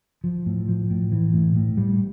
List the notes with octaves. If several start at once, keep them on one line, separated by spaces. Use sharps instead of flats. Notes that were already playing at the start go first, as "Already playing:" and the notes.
F3
A2
F3
A2
E3
A2
A2
G3